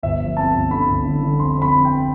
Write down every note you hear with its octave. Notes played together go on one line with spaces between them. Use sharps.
G1 E5
F3
F2 A5
G1
D3 B5
G1
D3
D3
F2 C6
F2 B5
F2
G5